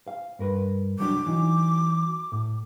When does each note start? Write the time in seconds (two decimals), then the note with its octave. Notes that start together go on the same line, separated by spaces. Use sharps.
0.08 F5
0.39 G2 A#4 B4
0.99 C2 F#3 D4 D6
1.26 E3 F#3 D#4
2.32 A2